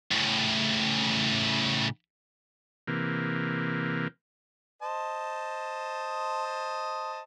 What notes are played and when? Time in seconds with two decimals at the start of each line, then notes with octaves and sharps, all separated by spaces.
0.11 A2 C#3
2.88 C3 E3 A#3
4.82 C5 D#5 A5